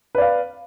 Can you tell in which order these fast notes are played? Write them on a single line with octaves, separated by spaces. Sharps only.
B4 D5 F5